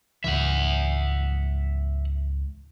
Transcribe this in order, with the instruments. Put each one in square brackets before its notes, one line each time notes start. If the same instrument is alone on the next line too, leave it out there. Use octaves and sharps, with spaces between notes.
[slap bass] C#2 G#2 E3 [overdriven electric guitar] E5 F#5